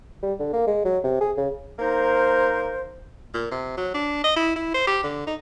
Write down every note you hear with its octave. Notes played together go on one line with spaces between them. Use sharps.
G3
D3
A#3
G#3
F#3
C3
G#4
C#3
A#3 D#4 A#4 C5
A#2
C3
F#3
D4
D#5
E4
E4
C5
G4
D3
D#4